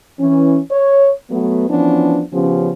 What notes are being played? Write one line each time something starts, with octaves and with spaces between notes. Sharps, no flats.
E3 C#4
C#5
F#3 A3 B3
E3 F3 B3 C#4 D4
C#3 F3 B3 C#4 G4